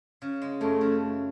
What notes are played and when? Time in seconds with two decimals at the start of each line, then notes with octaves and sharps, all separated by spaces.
0.22 C#3
0.42 G#3
0.61 F#2 A3
0.81 C#3